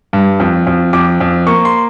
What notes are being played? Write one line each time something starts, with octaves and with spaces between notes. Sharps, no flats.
G2
F2
F2
F2 D6
F2
A#3 C#6
C6